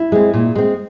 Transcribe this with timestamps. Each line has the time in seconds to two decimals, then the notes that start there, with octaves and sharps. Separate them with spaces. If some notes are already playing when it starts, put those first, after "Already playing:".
Already playing: E4
0.12 G#3 C4
0.34 A#2
0.55 G#3 C4